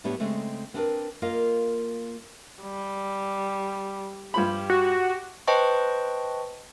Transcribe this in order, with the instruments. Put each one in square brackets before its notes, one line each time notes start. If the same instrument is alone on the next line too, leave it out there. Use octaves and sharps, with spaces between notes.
[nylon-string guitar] A2 G3 B3 D4 G4 C#5
C#3 G#3 A3 C4
B3 C4 D4 G#4 A#4 B4
A#3 F4 A#4 D#5 F5
[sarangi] G3
[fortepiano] G2 F3 B5 [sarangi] G4
[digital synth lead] F#4
[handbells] B4 C5 D#5 G5 A5 C#6